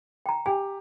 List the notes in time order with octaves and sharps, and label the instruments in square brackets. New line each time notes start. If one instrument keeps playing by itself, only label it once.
[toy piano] G5 A#5
[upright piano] G4 [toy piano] G#5